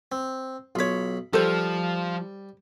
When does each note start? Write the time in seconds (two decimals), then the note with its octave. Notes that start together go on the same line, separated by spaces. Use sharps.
0.12 C4
0.75 B1 F4 C#5 B5
1.33 F3 G3 A4 C5